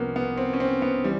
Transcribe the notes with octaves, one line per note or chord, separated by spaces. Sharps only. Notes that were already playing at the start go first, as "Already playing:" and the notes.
Already playing: C2 C3 F3 A#3 B3 C#4
B3
C4
C#4
C4
B3
E3 G3